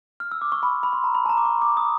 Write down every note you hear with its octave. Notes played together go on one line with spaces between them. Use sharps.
F6
E6
D6
C#6
B5
C6
B5
C6
A#5
B5
A5
A#5
D6
C#6
D6
D#6